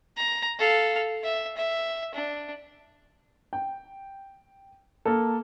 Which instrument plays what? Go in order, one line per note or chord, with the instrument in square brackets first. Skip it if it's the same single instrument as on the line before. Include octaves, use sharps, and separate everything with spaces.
[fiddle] A#5
A4 F5
E5
E5
D4
[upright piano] G5
A#3 A4